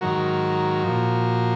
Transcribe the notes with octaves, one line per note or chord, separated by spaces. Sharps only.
G#2 D#3 F#3 F#4 A#4
A#2 F3